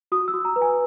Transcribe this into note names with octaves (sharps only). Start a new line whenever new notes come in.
F#4 D#6
E6
F#4
A#5
B4
G#5